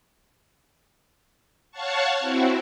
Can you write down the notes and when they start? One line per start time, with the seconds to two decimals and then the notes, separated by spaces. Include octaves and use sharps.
1.71 C#5 F5 F#5 A5 C#6
2.19 C4 E4 F#4